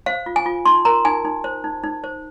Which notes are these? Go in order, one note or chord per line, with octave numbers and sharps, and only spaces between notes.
C5 F5
F4
G#5
F4
D#4 C6
A#4 A#5
D#4 G#5
D#4
C5
D#4
D#4
C5